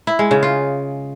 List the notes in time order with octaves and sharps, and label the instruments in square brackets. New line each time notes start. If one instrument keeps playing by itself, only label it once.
[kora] E4
G#3
C#3
F4